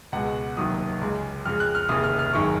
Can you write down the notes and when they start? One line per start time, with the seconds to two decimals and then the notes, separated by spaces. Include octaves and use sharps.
0.12 C#2 B2 G#3 F#5
0.57 F1 D#2 D#3 F#3 D#6
1.01 C#2 C#3 G#3
1.45 F2 C#3 G#3 F6
1.60 F#6
1.75 F6
1.89 F1 D#2 C#3 D#6
2.04 F6
2.19 F6
2.33 G#1 F#2 D#3 G#3 C#6